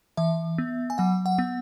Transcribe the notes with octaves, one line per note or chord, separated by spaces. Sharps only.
E3 E5
B3
G#5
F#3 F#5
F#5
B3